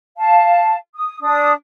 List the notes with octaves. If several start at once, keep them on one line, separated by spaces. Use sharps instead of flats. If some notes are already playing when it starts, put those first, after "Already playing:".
F5 A5
D#6
D4 D#6